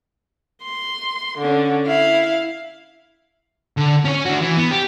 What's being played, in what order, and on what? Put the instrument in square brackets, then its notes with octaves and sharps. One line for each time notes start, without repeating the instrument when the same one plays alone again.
[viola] C6
D3 C#4
E4 F5
[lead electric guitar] D3
C#4 C#5
D4 F#4
E3
B3
G4